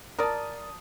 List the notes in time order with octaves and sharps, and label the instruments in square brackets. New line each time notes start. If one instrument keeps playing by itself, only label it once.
[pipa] A#4 D5 [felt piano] A5 D#6